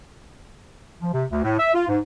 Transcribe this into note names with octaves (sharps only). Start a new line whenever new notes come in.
F3
C3
D2
A2
E5
F4
G#2